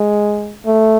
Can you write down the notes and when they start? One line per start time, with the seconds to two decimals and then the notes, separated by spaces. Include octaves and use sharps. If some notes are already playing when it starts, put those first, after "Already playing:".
Already playing: G#3
0.66 A3